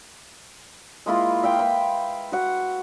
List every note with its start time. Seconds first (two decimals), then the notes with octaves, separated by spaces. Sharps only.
1.06 G#3 A#3 E4 F4
1.43 E5 F5 G5
1.59 B4 G5
2.32 F#4 F#5